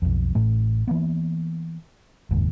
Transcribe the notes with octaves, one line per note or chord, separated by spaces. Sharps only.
B1 F2
A1 A2 A3
E3 A#3 B3
F#1 D#2 G#2